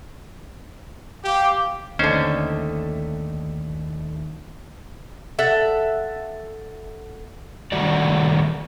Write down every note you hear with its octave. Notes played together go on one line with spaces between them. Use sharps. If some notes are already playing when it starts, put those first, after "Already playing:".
G4 F5 D6
D#2 D3 A3 C#4 D#4 C5
A4 E5 F#5
D#3 G3 A3 F#4 D5